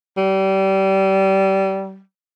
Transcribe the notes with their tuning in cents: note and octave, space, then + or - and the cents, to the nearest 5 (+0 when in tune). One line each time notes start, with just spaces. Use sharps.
G3 -25